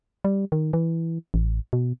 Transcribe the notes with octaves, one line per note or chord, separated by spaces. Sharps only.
G3
D#3
E3
A1
B2